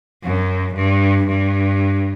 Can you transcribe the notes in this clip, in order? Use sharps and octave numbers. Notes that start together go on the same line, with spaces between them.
F#2
G2
G2